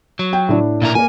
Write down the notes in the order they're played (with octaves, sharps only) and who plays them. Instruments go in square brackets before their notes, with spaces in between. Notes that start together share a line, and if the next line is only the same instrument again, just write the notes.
[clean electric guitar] F#3
[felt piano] G5
A2 D4
[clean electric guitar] A#2 E4 A#4
[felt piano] A#3 A#4 [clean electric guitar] G#5